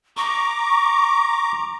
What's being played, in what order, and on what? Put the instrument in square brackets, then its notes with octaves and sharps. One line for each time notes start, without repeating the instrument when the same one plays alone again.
[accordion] A#5 D6 [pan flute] C#6